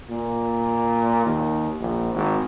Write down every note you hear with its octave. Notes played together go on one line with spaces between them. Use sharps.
A#2
D#2
A#1
G#1